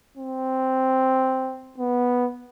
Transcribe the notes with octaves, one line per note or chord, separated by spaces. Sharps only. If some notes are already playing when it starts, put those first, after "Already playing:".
C4
B3